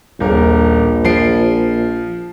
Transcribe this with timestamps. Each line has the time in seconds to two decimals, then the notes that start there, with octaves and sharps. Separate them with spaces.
0.20 D#1 A#1 A#4
1.04 F3 C7 D7